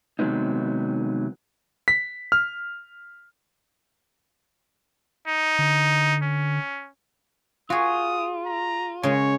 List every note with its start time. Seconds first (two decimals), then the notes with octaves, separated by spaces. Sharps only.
0.19 C3 D#3 F#3 G#3 B3 D#4
1.88 B6
2.32 F6
5.27 D#4
5.59 D3
6.22 C#4
7.70 F4 F#4 G#4 D#6
8.46 A#5
9.03 C#3 G#3 C#5